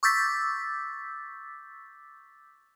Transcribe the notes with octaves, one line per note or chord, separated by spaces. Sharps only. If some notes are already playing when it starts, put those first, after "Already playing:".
C#6 D6 E6 G6 A6 B6